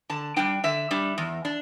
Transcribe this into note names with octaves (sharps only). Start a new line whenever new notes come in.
D3 A5
G3 D4 G5
D3 E5
G3 D4
E2
D4